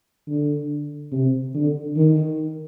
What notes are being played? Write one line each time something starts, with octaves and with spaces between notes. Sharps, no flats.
D3
C3
D3
D#3